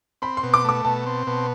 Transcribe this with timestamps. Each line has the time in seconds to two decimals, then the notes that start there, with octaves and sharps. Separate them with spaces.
0.22 C4 B5
0.37 C6
0.43 B2
0.54 D6
0.64 A3 D6
0.85 B2 A5
1.06 C4
1.27 B2